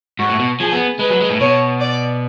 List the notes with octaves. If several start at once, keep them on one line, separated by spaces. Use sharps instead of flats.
G#2 F#4
A2
B2
F3 G#4
B3
G#3 B4
F#3
G#3
A2
B2 C#5
D5